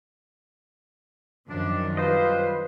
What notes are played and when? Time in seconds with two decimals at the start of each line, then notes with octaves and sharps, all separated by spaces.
1.50 F#2 D#3 F3 G3 D4
1.97 G3 F4 B4 C5 D#5